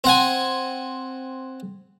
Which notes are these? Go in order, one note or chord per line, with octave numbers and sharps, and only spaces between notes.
C4 F#5 G#5